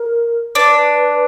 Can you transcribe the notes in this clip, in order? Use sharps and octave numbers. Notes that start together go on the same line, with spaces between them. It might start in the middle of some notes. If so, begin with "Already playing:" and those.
Already playing: A#4
D4 B4